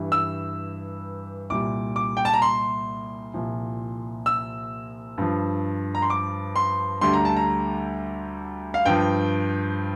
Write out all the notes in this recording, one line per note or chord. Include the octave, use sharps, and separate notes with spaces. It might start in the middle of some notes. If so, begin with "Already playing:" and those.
Already playing: G2 E3 G3
E6
C2 A#2 G3 D6
D6
G5
A5
A#5
C6
C2 A#2 F3
E6
G2 F3
A#5
C6
D6
C6
D2 D3 G3 C6
A#5
A5
A#5
F5
G2 F3 G5